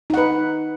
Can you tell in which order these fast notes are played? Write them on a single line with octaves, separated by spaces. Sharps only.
D#4 F#5 B4